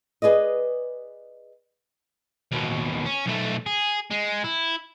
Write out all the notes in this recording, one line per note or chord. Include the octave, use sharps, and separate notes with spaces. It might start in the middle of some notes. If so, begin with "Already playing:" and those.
G#4 B4 D5 D#5
D#2 B2
C#4
B1 A3
G#4
G#3
E4